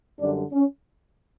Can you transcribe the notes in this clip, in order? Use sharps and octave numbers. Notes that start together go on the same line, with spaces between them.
F#2 D3 G3 D4
C#4